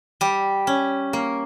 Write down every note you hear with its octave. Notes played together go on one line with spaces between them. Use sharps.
G3 G4
C#4
A#3